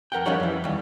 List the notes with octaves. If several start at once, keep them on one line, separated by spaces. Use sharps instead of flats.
F2 A#4 F#5 G5
F3 G3 C#4 D#4 C#5 F#5
F2 E3
D#2 G3